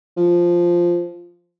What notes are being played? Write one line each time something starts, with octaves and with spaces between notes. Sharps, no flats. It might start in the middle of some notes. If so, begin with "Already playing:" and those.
F3